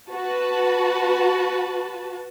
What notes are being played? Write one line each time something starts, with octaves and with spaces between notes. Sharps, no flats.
F#4 B4 A5